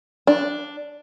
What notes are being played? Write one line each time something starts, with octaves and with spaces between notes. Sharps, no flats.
D4